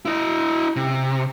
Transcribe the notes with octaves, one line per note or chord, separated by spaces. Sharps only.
E4 D#5
C3